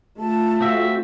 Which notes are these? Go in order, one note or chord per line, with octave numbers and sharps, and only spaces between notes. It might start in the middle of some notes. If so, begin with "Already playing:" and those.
A3 F4 A5
C4 F#4 E5 F5